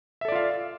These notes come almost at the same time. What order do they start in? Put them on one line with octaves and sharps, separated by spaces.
E5 A4 D5 F4 F5